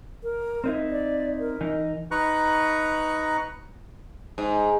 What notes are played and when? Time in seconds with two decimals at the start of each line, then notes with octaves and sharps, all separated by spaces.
0.24 A#4
0.64 C4 D#4 E4
0.90 D5
1.40 A#4
1.61 E3 D#4
2.11 D#4 B4 A#5 C#6 F#6
4.38 G#2